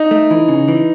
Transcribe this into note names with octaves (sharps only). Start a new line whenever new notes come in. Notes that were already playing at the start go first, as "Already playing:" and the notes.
Already playing: D#4
A3
E3
C#3
E3